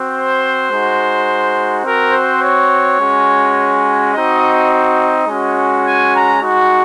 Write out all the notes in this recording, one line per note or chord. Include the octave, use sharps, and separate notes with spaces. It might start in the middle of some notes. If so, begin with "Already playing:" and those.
Already playing: C4 F#4
C5
G#3 D#4 F#4
C4 F#4 A#4
C5
C#5
G#3 C#4 F#4
C4 D#4 F#4 D#5
D#5
G#3 C#4 F#4
G#5
A#5
G#3 D#4 F#4